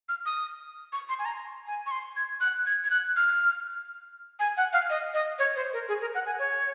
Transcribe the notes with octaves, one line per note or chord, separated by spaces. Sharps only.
F6
D#6
C#6
C6
G#5
A#5
G#5
C#6
C6
G#6
F#6
G#6
G#6
F#6
F6
G#5
F#5
F5
D#5
D#5
C#5
C5
A#4
G#4
A#4
F#5
G#5
C#5